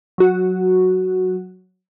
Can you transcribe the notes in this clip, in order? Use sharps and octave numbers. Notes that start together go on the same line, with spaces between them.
F#3 F#4